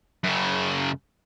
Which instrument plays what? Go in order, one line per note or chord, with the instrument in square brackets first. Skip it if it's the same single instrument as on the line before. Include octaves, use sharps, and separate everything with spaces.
[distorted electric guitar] F#2 C#3